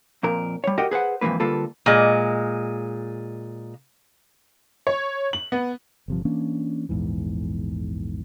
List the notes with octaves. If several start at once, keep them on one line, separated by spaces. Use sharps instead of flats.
F2 A#2 A#4
G3 C#5
F#4 G4 A#4 D#5 F#5 G5
G#4 B4 C5 F#5
F2 G#2 B2 E3 A#3 B4
D3 G3 A#3 F4 A4 B4
A#2 G#3
C#5
F#7
B3
G1 C3 F3
E3 A#3 C#4 D4
A#1 E2 G#2 E3